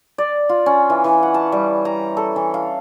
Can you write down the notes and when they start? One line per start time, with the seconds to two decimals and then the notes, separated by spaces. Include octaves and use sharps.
0.18 D5
0.49 F4
0.66 C#4
0.90 E3
1.04 E3
1.23 F#5
1.34 A5
1.52 G3
1.85 A#5
2.17 A4
2.36 E3
2.54 F5